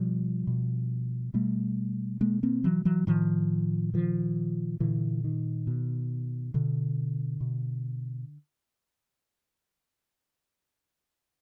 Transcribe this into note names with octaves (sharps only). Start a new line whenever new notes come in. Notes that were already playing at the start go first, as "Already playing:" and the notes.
Already playing: B2 F3 G3
B2
B2 G3 A3
B2 G#3 A#3
A#3 C4
E3 F#3
E3 F#3
A2 D#3 F3
A#2 D#3 F3
A#2 D3 E3
D#3
B2
B2 D3
B2